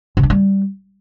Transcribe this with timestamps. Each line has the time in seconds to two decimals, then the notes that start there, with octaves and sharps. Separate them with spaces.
0.17 C3
0.23 D4
0.30 G3